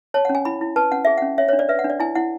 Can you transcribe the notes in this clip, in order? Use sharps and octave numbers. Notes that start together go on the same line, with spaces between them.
C#5 A5
F#5
C#4
G#5
E4 B5
E4
B4 A5
C#4 F#5
G#4 E5
F#5
C#4
C#5 E5
C#5
D4
D5
B4 E5
F#5
D4
D5
E4 G#5
E4 F#5